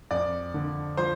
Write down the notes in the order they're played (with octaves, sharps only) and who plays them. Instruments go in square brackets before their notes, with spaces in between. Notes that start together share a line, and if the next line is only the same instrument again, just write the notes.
[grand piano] F2 D5
D3
F3 C5